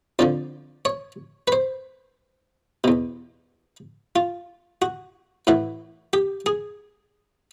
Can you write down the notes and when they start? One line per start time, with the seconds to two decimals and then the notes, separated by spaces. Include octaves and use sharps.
0.19 F2 D3 F3 D5
0.85 C#5
1.48 B4
1.52 C5
2.84 E2 B2
4.16 F4
4.82 F#4
5.47 A2 E3 F#4
6.13 G4
6.46 G#4